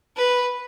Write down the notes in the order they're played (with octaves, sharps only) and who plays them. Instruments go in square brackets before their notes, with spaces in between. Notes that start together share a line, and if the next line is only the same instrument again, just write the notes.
[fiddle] B4